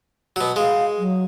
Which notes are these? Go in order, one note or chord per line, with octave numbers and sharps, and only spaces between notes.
B2 F#3
G#3 F5
F#3